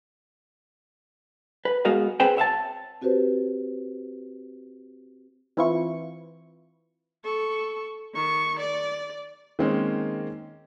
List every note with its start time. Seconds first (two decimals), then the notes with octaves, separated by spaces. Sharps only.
1.65 B4
1.85 G#3 B3 F#4 A#4 D#5 F5
2.20 C4 G#4 B4 C5 G5
2.37 C#5 E5 F5 A5
3.02 C4 F#4 G4 B4 C5
5.57 E3 C4 E4 F4 C#6
7.24 A4 C#6
8.15 D#3 C#6
8.59 D5
9.59 D#3 G#3 A#3 C4 C#4 D#4